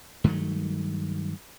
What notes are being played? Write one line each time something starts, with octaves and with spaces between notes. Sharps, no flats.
G2 D#3 F#3 A3